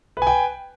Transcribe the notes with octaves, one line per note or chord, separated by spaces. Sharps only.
B4 G5 G#5